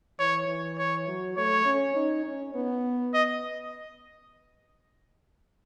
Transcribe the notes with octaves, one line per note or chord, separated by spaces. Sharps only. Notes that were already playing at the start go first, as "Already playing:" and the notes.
E3 C#5
E3
C#5
F#3
A3 C#5
C#4
D#4
C#4
B3
D#5